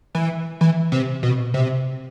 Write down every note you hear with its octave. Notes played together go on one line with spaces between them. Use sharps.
E3
E3
C3
B2
C3